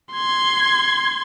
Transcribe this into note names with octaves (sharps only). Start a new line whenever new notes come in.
C6 G#6